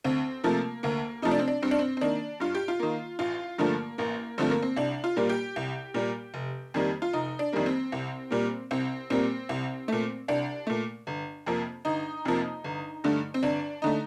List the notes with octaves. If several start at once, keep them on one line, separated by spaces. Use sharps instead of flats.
D2 C4
C3 F3 A3 A#3
D2 A#3
C3 F3 A3 D#4
D4
C4
D4
G2 C4
D4
C4
C4
D#3 A#3 D4
G2 F4
G4
F4
D#3 A#3
A1 F4
G2 D3 F3 A3 A#3
A1 A#3
G2 D3 F3 A3 C4
A#3
C4
C2 D4
F4
A#2 G3 A#3
G4
C2
A#2 G3 A#3
F1
F2 D#3 G3 A#3
F4
F1 D#4
D4
F2 D#3 G3 A#3
C4
C2
A#2 G3 A#3
C2 C4
A#2 G3 A#3 C4
C2
A#2 A3
C2 D4
A#2 A3
G1
F2 C3 F3 A#3
G1 D#4
F2 C3 F3 A#3
G1
G2 D3 A3
C4
G1 D4
D3 A3 D#4